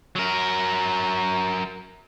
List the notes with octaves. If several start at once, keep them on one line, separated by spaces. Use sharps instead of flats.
F#3 A#4